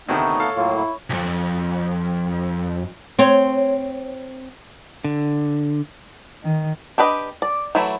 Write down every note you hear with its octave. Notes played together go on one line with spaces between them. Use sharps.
D2 C3 D#3 A3 B3 D#4 C#5
A4 F5
A2 F#3 A#3 F4
E4
B1 F2
C4 C#5
D3
D#3
D4 G4 B4 D#5
D5
E3 F#3 A3 E4